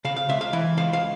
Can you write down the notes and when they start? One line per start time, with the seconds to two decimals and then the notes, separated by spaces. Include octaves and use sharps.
0.05 C#3 F5
0.16 F5
0.29 C#2 E5
0.41 F5
0.53 E3 E5
0.77 C#2 F5
0.93 F5